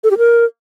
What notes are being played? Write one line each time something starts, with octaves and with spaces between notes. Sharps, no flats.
A4
G4
A#4